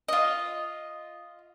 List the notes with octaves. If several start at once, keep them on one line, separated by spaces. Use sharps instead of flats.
F4 D#5